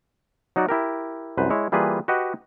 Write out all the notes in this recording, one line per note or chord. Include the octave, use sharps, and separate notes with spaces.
F#3 D#4 F#4 D5
E4 G4 A#4
C2 F#2 B4 C5
G#3 E4 C#5
E3 G3 A#3 F4 G#4 B4
F#4 G4 B4 D#5 F#5